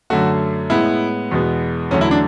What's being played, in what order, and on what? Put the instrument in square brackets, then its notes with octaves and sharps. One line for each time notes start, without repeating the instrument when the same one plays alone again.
[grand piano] F#2 D3 A3 F#4
A2 G#3 B3 E4
E2 B2 G#3 B3
E2 D3 F#3 A3 C#4
E4
D4